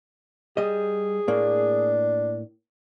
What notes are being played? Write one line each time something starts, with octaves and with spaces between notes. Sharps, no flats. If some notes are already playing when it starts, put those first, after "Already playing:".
G3 G#4 D#5
A2 A#3 D4